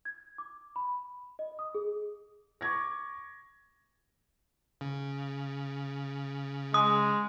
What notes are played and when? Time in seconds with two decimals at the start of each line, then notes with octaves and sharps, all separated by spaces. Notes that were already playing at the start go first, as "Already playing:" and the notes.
0.05 G#6
0.38 D6
0.76 B5
1.39 D#5
1.59 D#6
1.75 G#4
2.61 C#6 D6 G#6 A#6
4.81 C#3
6.74 G#3 D#6